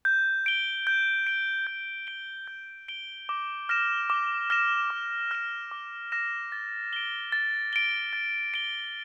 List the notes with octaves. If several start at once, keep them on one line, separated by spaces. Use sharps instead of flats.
G6
D7 G7
G6
D7 G7
G6
D7 G7
G6
D7 G7
D6
F6 A#6 E7
D6
F6 A#6 E7
D6
F6 A#6 E7
D6
F6 A#6 E7
A6
D7 G7
A6
D7 G7
A6
D7 G7